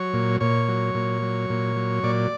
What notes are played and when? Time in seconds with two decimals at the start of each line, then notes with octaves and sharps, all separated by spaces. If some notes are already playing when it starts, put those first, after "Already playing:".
Already playing: F#3 C#5
0.13 A#2
0.40 A#2 C#5
0.68 F#3
0.95 A#2
1.22 F#3
1.50 A#2
1.76 F#3
2.03 A#2 D5